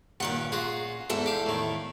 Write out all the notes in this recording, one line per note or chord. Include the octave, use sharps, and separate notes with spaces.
G2 A#2 D#3 C#4 F#5
F4 F#4 G#4
E2 G#2 E4 A4
G4 F5
A2 D#3